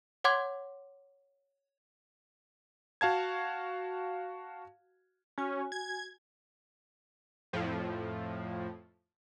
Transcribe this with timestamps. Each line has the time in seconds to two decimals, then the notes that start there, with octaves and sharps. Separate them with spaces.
0.24 C#5 F#5 C6 D6 G#6
3.01 F#4 F5 A5 G#6
5.38 C#4 F#4 G#5
5.72 G#6
7.53 F2 A2 F3